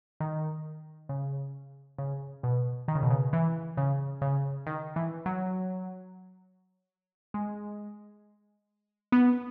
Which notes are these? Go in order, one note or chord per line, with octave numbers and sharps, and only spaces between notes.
D#3
C#3
C#3
B2
D#3
C#3
B2
C#3
E3
C#3
C#3
D#3
E3
F#3
G#3
B3